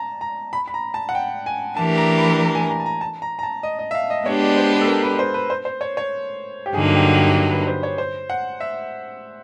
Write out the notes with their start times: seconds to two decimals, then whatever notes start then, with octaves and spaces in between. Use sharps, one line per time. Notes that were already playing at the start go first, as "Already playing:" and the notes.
Already playing: A5 A#5
0.21 A#5
0.53 B5
0.68 B5
0.74 A#5
0.94 A5
1.09 F#5
1.15 G5
1.46 G#5
1.77 E3 A3 D4 G4 A#4 A5
1.98 A#5
2.18 B5
2.39 A#5
2.55 G#5
2.70 A#5
2.80 A5
2.86 A#5
3.01 A5
3.22 A#5
3.39 A#5
3.43 A5
3.63 D#5
3.79 D#5
3.91 E5
3.95 F5
4.10 D#5
4.26 G#3 B3 D4 G4 C#5
4.41 D5
4.57 C5
4.73 B4
4.81 A4
4.88 A#4
5.03 B4
5.19 C5
5.34 B4
5.50 C5
5.65 C5
5.81 C#5
5.97 C#5
6.66 G4
6.74 G2 D3 F#3 A#3 D#4 G#4
6.95 G4
7.16 G4
7.51 B4
7.67 C5
7.83 C#5
7.98 C5
8.30 F#5
8.60 E5